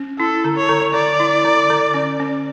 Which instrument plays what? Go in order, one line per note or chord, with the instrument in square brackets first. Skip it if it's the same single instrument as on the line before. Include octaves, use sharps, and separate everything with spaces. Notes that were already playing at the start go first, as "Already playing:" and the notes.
Already playing: [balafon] C#4
[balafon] E4 [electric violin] A4
[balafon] D3
[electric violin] C#5
[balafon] D3
[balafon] D3 [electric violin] D5
[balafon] E4
D3
D3
C#4
C#4